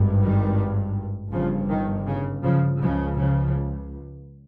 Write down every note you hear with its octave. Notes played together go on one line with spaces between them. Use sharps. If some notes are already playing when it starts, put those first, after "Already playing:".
Already playing: G#1 G2
D#3 G3
G1 G2 C#3 F3
D#3
C#3
C#3 F3
C#2 C#3 F3 G#3
C#3 F3